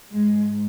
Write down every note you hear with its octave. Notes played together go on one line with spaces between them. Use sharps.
G#2 G#3